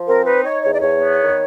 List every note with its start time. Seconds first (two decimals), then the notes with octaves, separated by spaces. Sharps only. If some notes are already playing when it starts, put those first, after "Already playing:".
Already playing: F3
0.08 C4 A#4
0.26 D#4 B4
0.45 D#4 C#5
0.64 E2 C#5
0.73 D5
0.82 E2 C#5
1.01 B3
1.21 D#3